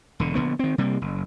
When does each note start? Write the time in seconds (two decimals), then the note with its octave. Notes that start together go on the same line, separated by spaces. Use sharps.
0.20 E1 D3
0.35 A#1 D3 B3
0.59 D#3 C4
0.78 C3 G3 A#3
1.02 F#1